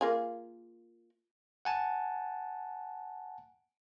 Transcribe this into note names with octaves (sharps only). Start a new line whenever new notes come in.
A#3 F4 G#4
F#5 G#5 A5